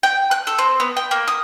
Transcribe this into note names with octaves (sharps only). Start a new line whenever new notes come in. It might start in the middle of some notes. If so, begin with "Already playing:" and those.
G5
F#6
A4
C4
B3
G5
A#3
D#6